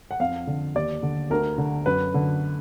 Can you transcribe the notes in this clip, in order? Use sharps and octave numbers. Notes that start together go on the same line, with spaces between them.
F#5
F2 F5
D3
D#2 D5
D3
D2 A#4
D3
F#2 B4
D3